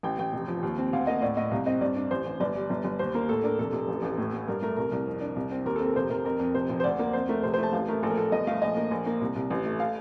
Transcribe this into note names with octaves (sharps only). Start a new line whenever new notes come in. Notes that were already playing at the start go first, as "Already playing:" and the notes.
A1 G5
A1 G5
F1
F3
D#2
C4
D2 F5
A#3 D#5
A2 D5
A2 D#5
C2 F5
C4 D#5
G2 D5
D4
A1 C5
A1
G1 D5
G3
G1
G1
D#2 C5
A#3 A#4
A2 A4
D4 A#4
F1 A4
F1
A1
A1
A2
A2
G2 A#4
A3 A#4
C2 A#4
C2
F2
D4
C2
C4
D#2 A#4
A4
C4 A#4
F1 C5
F1 A#4
F2 A#4
F2
F1 C5
F1
C5
D2 D5
A#3
F2 C5
A3 A#4
F1 C5
C5
A3 A5
A1 F5
A3 A#4
A#1 A4
A#4
A#1 A4
G1 D#5
A3 F5
A#1 D#5
A#3
A#1
A#3
C2
C2
A1
A3
F5